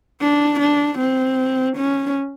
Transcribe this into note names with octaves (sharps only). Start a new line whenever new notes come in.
D4
D4
C4
C#4